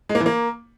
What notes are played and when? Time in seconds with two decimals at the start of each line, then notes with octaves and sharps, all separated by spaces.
0.09 G#3
0.15 A#3
0.20 E3
0.26 A#3